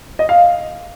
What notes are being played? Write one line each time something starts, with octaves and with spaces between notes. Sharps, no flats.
D#5
F5